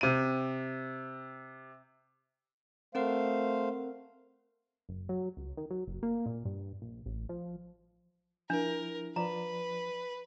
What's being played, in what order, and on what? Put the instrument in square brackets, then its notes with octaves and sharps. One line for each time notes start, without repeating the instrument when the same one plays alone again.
[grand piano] C3 D#7
[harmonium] A3 C5 F5 [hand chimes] C4 A#4 F#5
[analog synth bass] F#1
F#3
C#2
D#3
F#3
F#1
A#3
A#2
G2
A#1
A1
F3
[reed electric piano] F3 E4 [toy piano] D4 [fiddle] A#4
[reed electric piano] F3 D5 [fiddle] B4 [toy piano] A#5